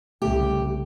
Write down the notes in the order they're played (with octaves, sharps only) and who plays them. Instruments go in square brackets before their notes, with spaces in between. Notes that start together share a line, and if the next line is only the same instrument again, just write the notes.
[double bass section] C2 [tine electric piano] C#3 A3 [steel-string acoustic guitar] G4